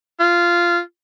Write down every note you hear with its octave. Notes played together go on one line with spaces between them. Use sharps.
F4